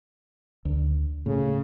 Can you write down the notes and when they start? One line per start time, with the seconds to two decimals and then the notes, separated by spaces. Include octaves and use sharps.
0.65 D2
1.26 A2 C#3